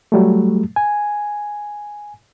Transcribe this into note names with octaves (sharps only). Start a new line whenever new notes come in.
F#3 G3 A3
G#5